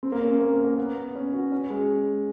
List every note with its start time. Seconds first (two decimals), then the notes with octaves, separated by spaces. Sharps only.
0.03 C4
0.12 A#3
0.22 C#4
0.31 C4
0.40 A#3
0.53 A#3
0.64 A#3
0.78 B3
0.96 B3
1.15 C#4
1.34 F#4
1.52 C#4
1.70 G#3